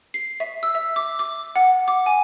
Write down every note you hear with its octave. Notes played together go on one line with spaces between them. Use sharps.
C7
E5
E6
E5
D6
D6
F#5
D6
G#5